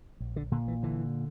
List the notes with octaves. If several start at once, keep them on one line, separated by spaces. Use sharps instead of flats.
A#1
D3
A#2 D3
E3
D3 E3